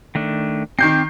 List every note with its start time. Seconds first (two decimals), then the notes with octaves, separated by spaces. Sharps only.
0.15 D#3 A3 D4
0.79 D#3 C4 D6 G6 C7